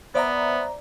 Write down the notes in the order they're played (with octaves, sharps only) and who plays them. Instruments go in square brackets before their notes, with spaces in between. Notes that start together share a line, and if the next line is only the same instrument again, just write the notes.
[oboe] B3 [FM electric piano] C5 E5 A#5 [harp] D5